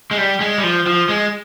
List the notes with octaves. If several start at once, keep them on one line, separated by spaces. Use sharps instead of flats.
G#3
G3
G#3
G3
F3
F3
G#3